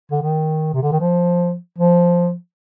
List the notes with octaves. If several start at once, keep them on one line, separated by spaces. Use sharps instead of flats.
D3
D#3
C3
D3
D#3
F3
F3